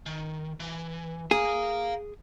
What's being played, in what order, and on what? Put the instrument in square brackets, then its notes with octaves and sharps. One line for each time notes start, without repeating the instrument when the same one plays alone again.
[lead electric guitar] D#3
E3
[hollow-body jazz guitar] G#4 [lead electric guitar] F5 A#5